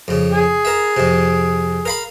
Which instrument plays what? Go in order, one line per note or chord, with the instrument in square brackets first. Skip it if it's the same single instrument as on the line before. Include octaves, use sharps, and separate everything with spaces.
[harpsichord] F2 C#3
[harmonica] G#4
[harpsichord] A#4 E5
F2 C3
A#4 F5 B5